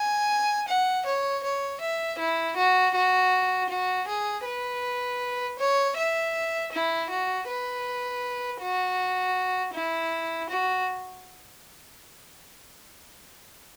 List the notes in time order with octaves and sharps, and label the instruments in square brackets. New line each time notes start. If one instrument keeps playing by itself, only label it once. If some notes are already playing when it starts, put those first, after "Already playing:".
Already playing: [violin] G#5
F#5
C#5
C#5
E5
E4
F#4
F#4
F#4
G#4
B4
C#5
E5
E4
F#4
B4
F#4
E4
F#4